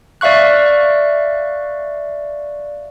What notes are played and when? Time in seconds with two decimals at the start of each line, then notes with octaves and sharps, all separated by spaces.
0.21 D5 E5 F5 C#6 F#6